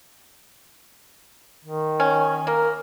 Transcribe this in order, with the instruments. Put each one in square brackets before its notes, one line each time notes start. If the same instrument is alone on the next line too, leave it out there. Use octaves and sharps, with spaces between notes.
[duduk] D#3
[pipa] C#4
[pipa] A#3 [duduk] A#4